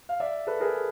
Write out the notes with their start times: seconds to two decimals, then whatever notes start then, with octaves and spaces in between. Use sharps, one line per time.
0.09 F5
0.20 D5 E5
0.47 A4 B4
0.60 G#4 A#4